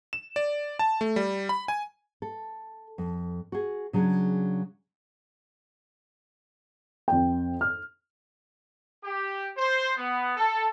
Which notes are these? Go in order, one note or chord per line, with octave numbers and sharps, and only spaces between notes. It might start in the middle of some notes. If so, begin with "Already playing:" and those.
E7
D5
A5
A3
G3
B5
G#5
A4
F2
F#4 G#4
C#3 F#3 D4 G#4
F2 G5
F6
G4
C5
B3
A4